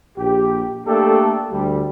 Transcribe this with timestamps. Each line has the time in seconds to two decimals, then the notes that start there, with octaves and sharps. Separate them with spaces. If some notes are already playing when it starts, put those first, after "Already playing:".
0.18 A#1 G4
0.86 A3 A#3 D4 G4 A4
1.51 D2 G3